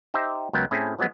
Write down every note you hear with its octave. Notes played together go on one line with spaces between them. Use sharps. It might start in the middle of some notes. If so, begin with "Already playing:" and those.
D#4 G4 C5 E5
C#2 F#3 B3 A#4 G5
A2 C4 C#4 E4 G#4 A4
F3 F#3 G#3 B3